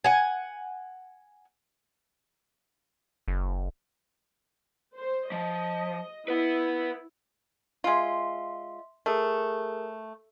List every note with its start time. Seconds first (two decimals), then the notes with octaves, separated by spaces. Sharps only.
0.04 F#5 G#5
3.28 F#1
4.97 C5
5.32 F3 D#5
6.28 E4 B4 F#5
7.84 G#3 F4 E5 C6
9.06 A3 G#4 A#4